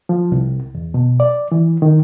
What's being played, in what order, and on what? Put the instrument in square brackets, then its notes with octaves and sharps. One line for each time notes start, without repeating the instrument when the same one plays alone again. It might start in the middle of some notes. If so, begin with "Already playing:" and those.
[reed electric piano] F3
C2
E2
B2
D5
E3
D#3